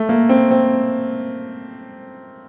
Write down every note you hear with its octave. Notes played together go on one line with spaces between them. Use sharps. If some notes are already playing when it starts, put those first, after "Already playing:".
Already playing: A3
A#3
C4
C4